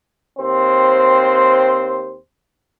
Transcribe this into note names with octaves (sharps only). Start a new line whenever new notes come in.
D#2 C4 C5